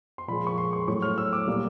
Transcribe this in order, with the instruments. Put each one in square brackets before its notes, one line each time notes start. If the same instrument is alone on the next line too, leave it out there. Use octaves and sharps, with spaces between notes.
[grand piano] C6
A#2 F3 G#3 B5
C#6
C6
C#6
A2 F#3 A3 C#6
F6
E6
D6
A#2 G3 A#3